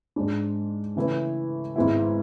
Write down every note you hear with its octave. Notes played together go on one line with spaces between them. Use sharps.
G#2 G#3 D4
C#3 E3 A3 E4 B4
G#1 G#2 G#3 B3 E4